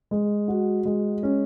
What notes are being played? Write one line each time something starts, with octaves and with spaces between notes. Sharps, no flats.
G#3
F#4
G#3
C#4